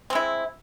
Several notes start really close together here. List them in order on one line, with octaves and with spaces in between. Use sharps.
C4 G#3 E4